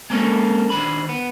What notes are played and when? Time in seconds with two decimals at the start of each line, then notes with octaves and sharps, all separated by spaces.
0.10 G#3 A#3 C4 C#4 A4 A#4
0.70 D#3 D4 C5 B5
1.09 B3